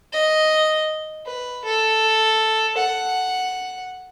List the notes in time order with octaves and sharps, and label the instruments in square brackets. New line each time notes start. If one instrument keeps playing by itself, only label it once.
[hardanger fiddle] D#5
B4
A4
F#5